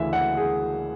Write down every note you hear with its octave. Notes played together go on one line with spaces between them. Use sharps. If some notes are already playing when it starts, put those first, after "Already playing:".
Already playing: D2 C#3 E3 E5
F#5
G#4